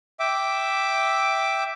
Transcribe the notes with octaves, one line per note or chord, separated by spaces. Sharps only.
E5 G5 D6